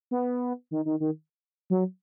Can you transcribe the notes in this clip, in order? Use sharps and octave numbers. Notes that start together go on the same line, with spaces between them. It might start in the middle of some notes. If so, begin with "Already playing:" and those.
B3
D#3
D#3
D#3
F#3